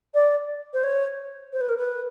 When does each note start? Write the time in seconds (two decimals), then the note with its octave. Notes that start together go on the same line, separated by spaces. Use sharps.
0.14 D5
0.73 C5
0.83 C#5
1.52 C5
1.60 B4
1.68 A#4
1.76 B4